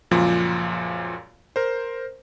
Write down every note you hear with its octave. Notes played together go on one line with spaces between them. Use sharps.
C#2 F#2 A#2 F3
A#4 C5